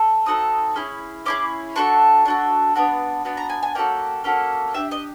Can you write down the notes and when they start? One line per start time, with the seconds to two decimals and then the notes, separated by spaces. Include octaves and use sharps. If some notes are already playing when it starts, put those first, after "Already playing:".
Already playing: A4
0.26 C4 D#4 F#4 A4 D#6
0.76 C#4 E4 G#4
1.25 C#4 E4 G#4 D6
1.76 D4 F#4 A4 C#6
2.25 D4 F#4 A4
2.75 B3 D4 F#4
3.25 B3 D4 F#4
3.37 A#5
3.50 G#5
3.63 G#5
3.75 A#3 C#4 F#4 A4 G5
4.24 A#3 C#4 F#4 A4
4.74 D4 G4 E5
4.91 D#5